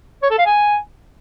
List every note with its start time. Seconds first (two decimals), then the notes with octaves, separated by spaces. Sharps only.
0.22 C#5
0.30 A4
0.38 F5
0.46 G#5